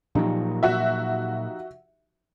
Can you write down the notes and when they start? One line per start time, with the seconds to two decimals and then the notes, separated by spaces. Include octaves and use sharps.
0.15 A#2 F3 F#3 D#4 G4
0.63 F#4 E5